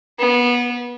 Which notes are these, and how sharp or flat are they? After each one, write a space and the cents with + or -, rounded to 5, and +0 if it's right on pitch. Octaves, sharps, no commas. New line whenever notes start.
B3 -25